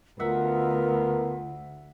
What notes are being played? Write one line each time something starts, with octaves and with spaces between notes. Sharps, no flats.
D2 B3 F4 A#4 E5 F#5